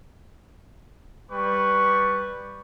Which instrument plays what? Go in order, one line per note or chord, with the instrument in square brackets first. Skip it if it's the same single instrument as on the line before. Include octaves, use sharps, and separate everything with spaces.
[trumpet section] G3 B4 C#6